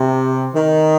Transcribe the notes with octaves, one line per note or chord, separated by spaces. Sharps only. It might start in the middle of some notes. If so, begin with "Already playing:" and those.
Already playing: C3
D#3